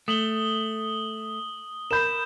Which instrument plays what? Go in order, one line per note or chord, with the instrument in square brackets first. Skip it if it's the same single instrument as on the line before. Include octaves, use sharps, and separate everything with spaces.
[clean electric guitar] A3 [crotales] D#6 F#7 G7
[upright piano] A#4 B5 [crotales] G6 E7